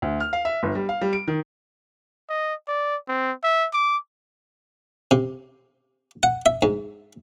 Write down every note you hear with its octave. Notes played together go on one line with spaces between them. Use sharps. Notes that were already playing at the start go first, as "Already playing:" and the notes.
D2
F6
F5
E5
G1
G3
F5
G3
D7
D#3
D#5
D5
C4
E5
D6
C3
F#5
E5
G#2